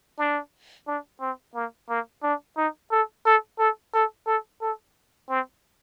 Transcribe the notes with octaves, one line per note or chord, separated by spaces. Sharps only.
D4
D4
C4
A#3
A#3
D4
D#4
A4
A4
A4
A4
A4
A4
C4